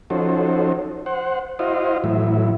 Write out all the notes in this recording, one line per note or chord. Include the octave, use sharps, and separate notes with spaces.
F3 C#4 D#4 F#4 A4 C5
C5 F#5
E4 F#4 C5 D#5 F5
A2 E3 F#3 E4